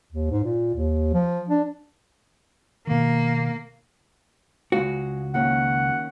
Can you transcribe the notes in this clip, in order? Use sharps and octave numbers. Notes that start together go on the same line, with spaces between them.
D#2
G#2
A#2
D#2
F3
D4
B2 D#3 A#3
C#2 G#3 F#4 F5
D#3 A#3 C#4 F#5